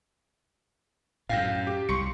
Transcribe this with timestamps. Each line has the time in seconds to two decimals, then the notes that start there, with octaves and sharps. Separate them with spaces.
1.29 F#2 A2 F5 G5 A#6
1.67 G4
1.89 C2 C6 C#6 C#7